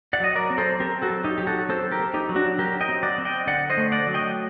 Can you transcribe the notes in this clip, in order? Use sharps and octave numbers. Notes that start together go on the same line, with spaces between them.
D5 F#5
F#3 D#5
A#4 D5
C4
A4 C5
C4 G4 A#4
F#4 A4
F#3
D#4 G4
F#3 G4
F#4 A4
C4 A4 C5
G4 A#4
C4
D#4 G4
F#3
D4 F#4
F#3 G4 A#4
D#5 G5
C4
D5 F#5
C4
D#5 G5
D3 D5 F#5
C5 D#5
A3
D5 F#5
F#3
D#5 G5